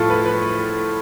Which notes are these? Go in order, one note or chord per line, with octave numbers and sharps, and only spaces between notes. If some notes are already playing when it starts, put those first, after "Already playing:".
Already playing: A2 F3 A3 F4 A4
B4
B4